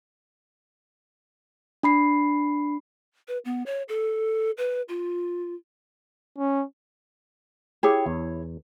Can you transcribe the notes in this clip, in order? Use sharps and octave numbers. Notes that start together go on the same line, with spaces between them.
D4 B5 C7
B4
B3
C#5
A4
B4
F4
C#4
E4 G4 G#4 C#5
E2